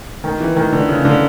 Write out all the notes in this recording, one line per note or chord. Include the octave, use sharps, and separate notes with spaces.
D#3
E3
D#3
D3
C#3
D3